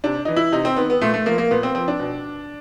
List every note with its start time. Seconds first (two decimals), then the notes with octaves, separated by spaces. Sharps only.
0.04 C3 D4
0.25 E3 D#4
0.36 E4
0.52 C3 D#4
0.65 C4
0.76 D#3 B3
0.90 B3
1.02 A#2 A3
1.14 A3
1.26 F3 A#3
1.38 A#3
1.51 A#2 B3
1.63 C4
1.75 F3 C4
1.88 D4
2.00 B2